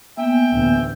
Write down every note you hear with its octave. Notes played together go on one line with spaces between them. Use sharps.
A#3 B3 E5 G5 G#5
A1 D2